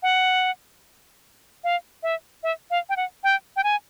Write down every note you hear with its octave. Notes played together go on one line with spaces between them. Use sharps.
F#5
F5
E5
E5
F5
G5
F#5
G5
G5
G#5